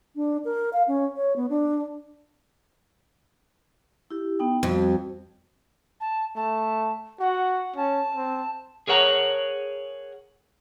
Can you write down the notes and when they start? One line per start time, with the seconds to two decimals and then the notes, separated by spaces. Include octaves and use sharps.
0.16 D4
0.45 A#4
0.73 F5
0.88 C#4
1.16 C#5
1.36 B3
1.50 D4
4.10 E4 G4
4.39 B3 D#4 G5
4.63 F2 G3 F#4
6.00 A5
6.36 A3 A5
7.20 F#4 F#5
7.76 C#4 A5
8.15 C4
8.87 G#4 A#4 C#5 F#5 A5 A#5